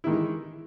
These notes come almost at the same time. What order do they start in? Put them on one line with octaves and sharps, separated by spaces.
E4 D#3 G#3 E3